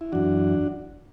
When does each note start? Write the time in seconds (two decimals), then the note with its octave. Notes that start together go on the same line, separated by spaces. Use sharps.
0.01 E4
0.12 F#2 E3 D4 F#4